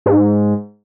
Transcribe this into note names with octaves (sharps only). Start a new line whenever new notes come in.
G#2